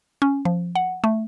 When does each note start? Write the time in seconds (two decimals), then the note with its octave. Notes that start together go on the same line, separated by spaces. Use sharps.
0.22 C#4
0.45 F3
0.75 F#5
1.04 A3